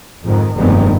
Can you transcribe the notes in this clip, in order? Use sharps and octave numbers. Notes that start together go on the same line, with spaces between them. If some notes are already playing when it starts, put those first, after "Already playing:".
F2 G#2 D#3
F1 G2 D#3 G#3 B3 C4